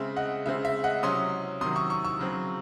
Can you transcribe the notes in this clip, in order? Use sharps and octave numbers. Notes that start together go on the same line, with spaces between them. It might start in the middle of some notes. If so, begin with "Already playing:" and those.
Already playing: C#3 G#3 C4 E5
D#5 F#5
C#3 G#3 C4 E5
E5
D#5 F#5
C3 F#3 C#4 C6 D#6
C3 D#3 F#3 C6 D#6
C#6 E6
C#6 E6
C#6 E6
C#3 F#3 C4